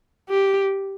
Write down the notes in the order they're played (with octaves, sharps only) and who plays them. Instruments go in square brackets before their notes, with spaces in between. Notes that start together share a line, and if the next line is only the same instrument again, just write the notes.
[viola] G4